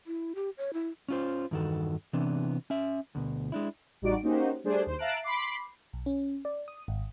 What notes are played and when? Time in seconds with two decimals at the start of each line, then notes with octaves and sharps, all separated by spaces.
0.07 E4
0.35 G4
0.58 C#5
0.73 E4
1.09 C#4 F4 C5
1.51 E2 G2 D#3 F#4 A4
2.13 C3 E3 B3 C4 D4
2.70 C#4 E5
3.15 D2 B2
3.52 G#3 D4 E4
4.01 A1 G3 D#4 F#4 D5 D7
4.23 A#3 C#4 D#4 F#4 G4 C5
4.64 G3 A3 D4 G#4 C5
4.86 D#2 C5
4.98 E5 F5 A5 A#5 F#6 D7
5.23 B5 C6 D6 C7
5.93 B1
6.06 C#4
6.45 D5
6.68 D#6
6.88 G#1